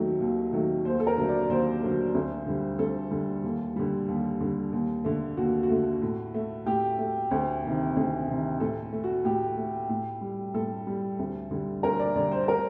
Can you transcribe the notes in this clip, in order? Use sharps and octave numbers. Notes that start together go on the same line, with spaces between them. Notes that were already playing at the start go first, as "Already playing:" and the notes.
Already playing: D#2 D#3 F#3 A3
D#2
D#3 F#3 A3
D#2 C5
A4
A#4
D3 F#3 A3
D5
D#2 C5
D3 F#3 A3
D2
D3 G3
D2 A4
D3 G3
D#2
D3 G3
D#2
D3 G3
D#2
D3 A3
D#2 F#4
F#4
D3 A3
A2
A3
A2 G4
A3
D2
C3 D#3
D2
C3 D#3
A2 A4
A3
F#4
A2 G4
A3
A2
G3
A2 A4
G3
D2
D3 G3
D2 A#4
D5
D3 G3 D5
C5
A#4